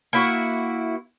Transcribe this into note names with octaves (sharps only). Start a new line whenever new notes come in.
A#3 E4 F#4